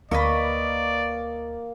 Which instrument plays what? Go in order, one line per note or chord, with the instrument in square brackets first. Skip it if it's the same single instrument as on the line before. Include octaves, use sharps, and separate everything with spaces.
[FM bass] D2 [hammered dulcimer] A#3 [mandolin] B4 D#5 C#6 [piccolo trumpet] D5